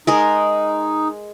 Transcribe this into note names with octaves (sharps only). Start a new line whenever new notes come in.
G#3 D#4 G#4 A#4